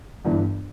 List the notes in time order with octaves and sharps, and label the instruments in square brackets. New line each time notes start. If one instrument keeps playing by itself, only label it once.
[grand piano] G1 G2 E3